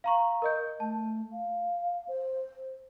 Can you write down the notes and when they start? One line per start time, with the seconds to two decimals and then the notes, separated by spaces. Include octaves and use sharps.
0.04 F5 A#5 C#6
0.42 A#4 D#5 G6
0.80 A3 A5
1.32 F5
2.08 C5